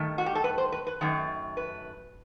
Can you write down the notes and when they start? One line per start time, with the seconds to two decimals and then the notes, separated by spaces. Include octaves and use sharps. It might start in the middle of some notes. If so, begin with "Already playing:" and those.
Already playing: G2 D#3 A3
0.18 F#4
0.26 G4
0.35 A4
0.44 B4
0.58 C5
0.72 B4
0.87 B4
1.01 F#2 D#3 A3
1.57 B4